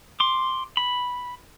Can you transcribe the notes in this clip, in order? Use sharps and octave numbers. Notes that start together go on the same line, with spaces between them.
C6 D6
B5